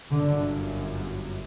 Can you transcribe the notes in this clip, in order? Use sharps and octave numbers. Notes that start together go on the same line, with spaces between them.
G1 F#2 D3